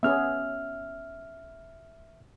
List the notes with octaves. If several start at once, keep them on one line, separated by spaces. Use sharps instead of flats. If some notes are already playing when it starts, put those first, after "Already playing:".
B3 C#4 G#4 E5 F6